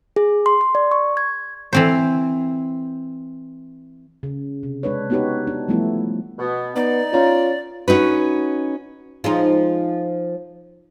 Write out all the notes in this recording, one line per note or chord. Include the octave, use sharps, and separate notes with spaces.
G#4
C6
C6
D5
C#6
G#6
E3 C4 C5
C#3
C3
G#3 D4 B4 C#5
B3 D#4 F#4 G4 B4 C#5
D4
E3 F3 G3 A3 B3 E4
B2 B3
B3 D#4 D5
C#4 F4 C#5 A#5
C#4 D#4 F#4 B4
F3 G#3 D#4